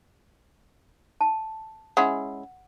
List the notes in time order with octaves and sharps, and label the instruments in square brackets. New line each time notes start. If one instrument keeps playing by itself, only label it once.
[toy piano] A5
[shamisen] G#3 C#4 E4 [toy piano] F#5